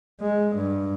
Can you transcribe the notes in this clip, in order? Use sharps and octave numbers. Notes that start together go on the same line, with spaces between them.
G#3
G2